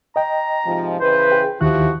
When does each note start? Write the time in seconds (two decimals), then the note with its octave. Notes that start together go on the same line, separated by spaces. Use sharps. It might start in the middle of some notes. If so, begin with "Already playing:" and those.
0.16 D#5 G5 A#5
0.66 G#2 C3 F3
1.00 C#3 E3 B4 C5
1.32 G#4 G5
1.61 D#2 D#3 F3 E4 F#4 G4 F#6